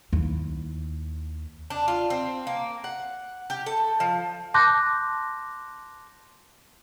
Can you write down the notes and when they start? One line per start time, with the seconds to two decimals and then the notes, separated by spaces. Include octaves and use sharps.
0.13 D#2 E4
1.70 D4
1.88 F4
2.10 C4
2.47 A#3
2.84 F#5
3.50 G4
3.66 A4
4.00 F3
4.54 A5 C6 D6 F#6 G6 A#6